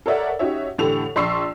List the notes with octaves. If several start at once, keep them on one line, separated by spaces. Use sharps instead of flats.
A4 A#4 C#5 D5 E5 F#5
C#4 D#4 F#4 G4 C#5 E5
A2 D3 E3 G4 A4 F7
A#1 D5 C6 C#6 E6 C7